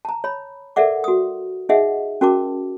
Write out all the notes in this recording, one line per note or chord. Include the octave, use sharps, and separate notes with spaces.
A5 A#5
C#5 B5
A4 A#4 D5 E5 F#5 D6
F#4 D#6
D#4 G#4 D#5 E5 F#5
C#4 F#4 A#4 A5 D6